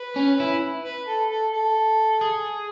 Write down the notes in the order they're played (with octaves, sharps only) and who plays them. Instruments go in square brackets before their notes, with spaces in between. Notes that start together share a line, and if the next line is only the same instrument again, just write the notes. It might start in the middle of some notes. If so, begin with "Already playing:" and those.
Already playing: [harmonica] B4
[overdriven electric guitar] C#4
E4
[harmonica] B4
A4
A4
A4
[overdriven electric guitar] G#4